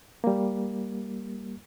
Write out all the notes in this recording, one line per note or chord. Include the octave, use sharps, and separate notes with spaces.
G3 A#3